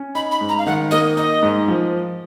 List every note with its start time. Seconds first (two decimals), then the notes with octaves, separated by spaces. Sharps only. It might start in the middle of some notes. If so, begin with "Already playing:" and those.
Already playing: C#4
0.15 D#4 B5
0.31 B5
0.41 G#2
0.49 A#5
0.58 F5
0.67 D#3 F#5
0.91 A#3 D#5
1.17 D#4 D#5
1.43 G#2
1.68 F3